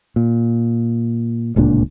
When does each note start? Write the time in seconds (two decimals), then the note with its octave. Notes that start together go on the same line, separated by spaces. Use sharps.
0.16 A#2
1.56 D1 C#2 A#2 D4